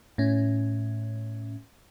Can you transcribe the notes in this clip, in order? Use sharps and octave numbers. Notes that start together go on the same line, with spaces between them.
A2 C#4